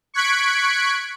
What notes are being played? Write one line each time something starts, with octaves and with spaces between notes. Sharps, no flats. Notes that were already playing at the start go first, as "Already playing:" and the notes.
C#6 F#6 G#6 B6 C#7 D7